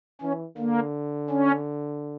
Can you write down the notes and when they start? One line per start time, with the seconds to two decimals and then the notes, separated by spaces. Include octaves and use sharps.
0.22 E3 C#4
0.57 D3 A#3
1.30 C#4